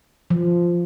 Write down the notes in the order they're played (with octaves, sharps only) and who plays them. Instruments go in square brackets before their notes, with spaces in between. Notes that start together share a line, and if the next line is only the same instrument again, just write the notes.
[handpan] F3